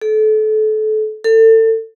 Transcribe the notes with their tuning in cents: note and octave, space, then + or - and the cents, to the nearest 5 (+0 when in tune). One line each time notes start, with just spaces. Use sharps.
A4 -30
A4 +30